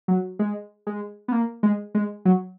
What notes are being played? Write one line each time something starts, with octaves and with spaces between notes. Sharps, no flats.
F#3
G#3
G#3
B3
A#3
G#3
G#3
F#3